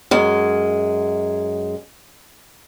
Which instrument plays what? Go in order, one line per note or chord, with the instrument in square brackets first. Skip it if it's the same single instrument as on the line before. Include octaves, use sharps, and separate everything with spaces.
[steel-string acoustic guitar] F#2 G#3